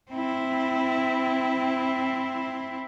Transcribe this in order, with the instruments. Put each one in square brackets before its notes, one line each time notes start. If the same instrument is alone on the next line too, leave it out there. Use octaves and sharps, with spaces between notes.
[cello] C4 E4